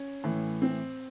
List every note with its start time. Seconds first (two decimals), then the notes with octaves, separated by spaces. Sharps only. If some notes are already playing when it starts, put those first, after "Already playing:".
Already playing: C#4
0.24 A2 E3
0.62 C4